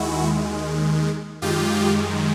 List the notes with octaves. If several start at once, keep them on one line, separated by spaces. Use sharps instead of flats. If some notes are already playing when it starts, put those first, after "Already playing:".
Already playing: D#2 D#3 G#3 E4 F#4
F#2 D#3 G#3 F4 G4